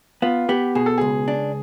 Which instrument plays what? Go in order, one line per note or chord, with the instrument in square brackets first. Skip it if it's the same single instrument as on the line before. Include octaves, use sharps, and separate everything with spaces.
[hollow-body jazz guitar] B3 [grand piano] F4
[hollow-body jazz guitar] B3 [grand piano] G4
[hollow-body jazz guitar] B2 [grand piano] G#4
[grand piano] A4
[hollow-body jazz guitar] C#2 [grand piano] G#4
[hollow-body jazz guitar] D4